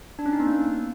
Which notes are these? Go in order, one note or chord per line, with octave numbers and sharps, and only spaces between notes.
D4
C#4
D#4
B3
A#3